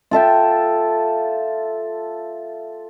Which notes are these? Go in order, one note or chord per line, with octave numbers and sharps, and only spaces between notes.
F4 A4 E5 G5